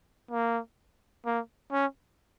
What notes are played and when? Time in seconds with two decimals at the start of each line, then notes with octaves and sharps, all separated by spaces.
0.31 A#3
1.25 A#3
1.72 C#4